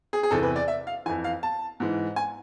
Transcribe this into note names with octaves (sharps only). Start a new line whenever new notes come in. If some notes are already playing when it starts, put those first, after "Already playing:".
G#4
G#4
E2 C3 E3 A4
B4
D5
E5
F5
F2 E3 G#5
F5
A5
G#2 E3
G#5